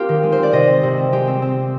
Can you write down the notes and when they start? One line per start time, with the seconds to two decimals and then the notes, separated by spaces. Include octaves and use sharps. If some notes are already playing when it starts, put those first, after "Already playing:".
Already playing: A#3 C4 F4 G4
0.09 D#3
0.23 G#3
0.32 C5
0.37 C4
0.43 D5
0.52 C3 D#5
0.67 C4
0.83 C3
0.97 C4
1.12 G#3 G4
1.27 C4
1.42 C4